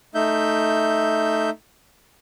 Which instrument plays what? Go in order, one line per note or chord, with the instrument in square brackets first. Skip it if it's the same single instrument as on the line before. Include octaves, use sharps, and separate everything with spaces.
[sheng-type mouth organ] A3 D#4 E5 G6